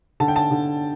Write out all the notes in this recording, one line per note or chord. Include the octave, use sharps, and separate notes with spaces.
D3 A5
G5
A5
D3